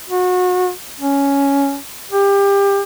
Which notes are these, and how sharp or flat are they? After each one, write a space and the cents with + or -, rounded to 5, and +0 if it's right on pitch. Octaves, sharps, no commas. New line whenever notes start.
F#4 -30
C#4 +10
G4 +25